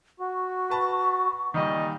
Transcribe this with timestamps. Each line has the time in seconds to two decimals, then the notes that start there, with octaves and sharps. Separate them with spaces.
0.20 F#4 C#6
0.70 B4 A5 B5
1.54 A#2 D#3 G3 D#4 D#5